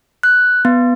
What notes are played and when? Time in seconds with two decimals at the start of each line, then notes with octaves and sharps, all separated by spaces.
0.23 F#6
0.65 B3